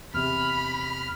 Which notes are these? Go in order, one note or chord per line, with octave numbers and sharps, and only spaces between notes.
E2 C3 B5 F6